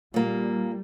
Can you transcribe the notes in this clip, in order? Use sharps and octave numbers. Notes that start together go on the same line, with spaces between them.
A#2 G3 A#3